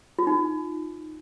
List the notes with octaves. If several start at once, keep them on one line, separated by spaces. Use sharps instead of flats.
F4
D#4